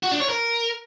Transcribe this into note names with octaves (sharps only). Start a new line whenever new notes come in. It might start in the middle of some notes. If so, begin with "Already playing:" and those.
F#4
D4
C#5
A#4